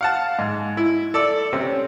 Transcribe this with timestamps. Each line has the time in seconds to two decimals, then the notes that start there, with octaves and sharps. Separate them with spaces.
0.01 F5 F#5 A5
0.39 G#2
0.77 E4
1.14 A4 D5 E6
1.53 C3 C4 C#4